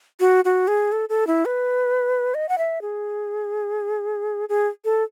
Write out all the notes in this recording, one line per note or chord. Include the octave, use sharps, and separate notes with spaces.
F#4
F#4
G#4
A4
A4
E4
B4
D#5
F#5
E5
G#4
G#4
A4